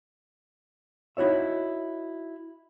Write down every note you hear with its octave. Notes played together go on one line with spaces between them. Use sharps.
D#4 E4 F#4 C#5 E5